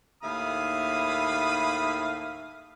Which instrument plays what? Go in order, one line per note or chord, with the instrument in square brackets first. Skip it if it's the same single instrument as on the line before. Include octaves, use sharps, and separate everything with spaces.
[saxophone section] D#2 A2 E5 [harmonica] F5 B5 D#6